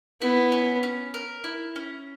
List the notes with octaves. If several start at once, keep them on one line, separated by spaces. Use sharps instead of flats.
B3 E4
C#4
C#4
A#4
E4
C#4